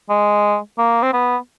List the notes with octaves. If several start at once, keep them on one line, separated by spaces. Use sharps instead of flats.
G#3
A#3
C4
B3